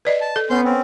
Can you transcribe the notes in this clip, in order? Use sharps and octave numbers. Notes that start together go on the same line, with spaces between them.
B4 D5 D#5
A5
A4
B3 C#4 C6 G6
C4 C#4